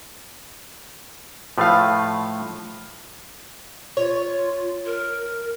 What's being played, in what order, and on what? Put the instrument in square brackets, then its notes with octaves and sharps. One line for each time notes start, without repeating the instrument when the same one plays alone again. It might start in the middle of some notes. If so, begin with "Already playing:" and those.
[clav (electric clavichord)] A2 F3 A3 [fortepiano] B4 F5
[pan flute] F4 [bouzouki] C#5
[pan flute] A#4